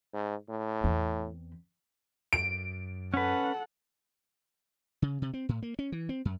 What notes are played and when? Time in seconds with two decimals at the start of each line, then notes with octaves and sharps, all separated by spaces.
0.13 G#2
0.49 A2
0.84 E2 C4
2.33 F#2 D7
3.14 C#4 A4 B4 F#5
5.02 C#3
5.22 C3
5.34 C4
5.49 A2
5.62 A#3
5.79 C#4
5.92 E3
6.09 C4
6.25 F#2